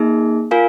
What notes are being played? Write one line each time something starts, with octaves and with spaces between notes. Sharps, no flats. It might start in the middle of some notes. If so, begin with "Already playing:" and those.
Already playing: A#3 D#4 G#4
F4 A#4 F5 G#5